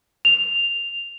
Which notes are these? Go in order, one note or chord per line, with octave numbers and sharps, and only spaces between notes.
F7